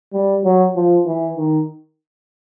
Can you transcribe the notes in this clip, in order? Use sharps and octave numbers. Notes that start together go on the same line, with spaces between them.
G3
F#3
F3
E3
D#3